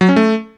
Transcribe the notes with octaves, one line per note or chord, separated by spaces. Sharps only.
F#3
C#4
A3